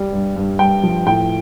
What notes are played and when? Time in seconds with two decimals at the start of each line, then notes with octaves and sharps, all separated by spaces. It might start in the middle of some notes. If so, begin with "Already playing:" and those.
Already playing: G3
0.13 G2
0.36 G2
0.59 G2 G5
0.83 F3
1.06 A2 G5